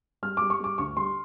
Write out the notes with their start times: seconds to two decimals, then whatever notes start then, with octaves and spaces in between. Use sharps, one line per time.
0.22 G3 F6
0.37 G3 D6
0.50 C#6
0.60 G3 D6
0.78 D2 C#6
0.97 G3 C6